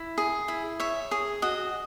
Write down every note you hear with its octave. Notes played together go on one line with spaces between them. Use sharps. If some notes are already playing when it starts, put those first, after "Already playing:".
Already playing: E4
G#4
E4
C#5 E5
G#4
F#4 D#5